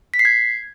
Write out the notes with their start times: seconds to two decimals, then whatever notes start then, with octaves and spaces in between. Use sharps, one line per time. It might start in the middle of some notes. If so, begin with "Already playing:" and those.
0.14 B6
0.19 C7
0.25 G#6